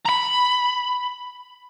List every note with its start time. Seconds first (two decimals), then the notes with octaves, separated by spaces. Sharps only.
0.06 A#5 B5